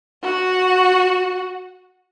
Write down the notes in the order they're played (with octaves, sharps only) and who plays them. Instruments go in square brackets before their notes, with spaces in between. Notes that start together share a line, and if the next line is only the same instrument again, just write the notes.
[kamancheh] F#4